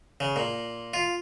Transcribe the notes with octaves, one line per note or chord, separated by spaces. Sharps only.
C#3
A#2
F4